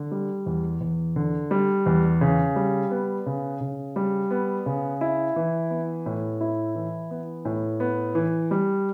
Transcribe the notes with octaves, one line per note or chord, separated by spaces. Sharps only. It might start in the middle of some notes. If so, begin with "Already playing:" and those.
Already playing: D3
G3
E2
E2
D3
G3
E2
C#3
G3
B3
C#3
C#3
G3
B3
C#3
E4
E3
B3
A2
E4
E3
B3
A2
B3
E3
G3